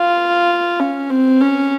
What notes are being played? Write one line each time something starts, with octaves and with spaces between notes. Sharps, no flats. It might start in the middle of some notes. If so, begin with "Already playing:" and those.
Already playing: F4
C#4
C4
C#4